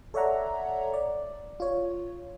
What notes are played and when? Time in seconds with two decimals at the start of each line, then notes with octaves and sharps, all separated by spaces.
0.14 A4 C#5 D5 E5 F#5 A#5
0.93 D5
1.60 F4 C#5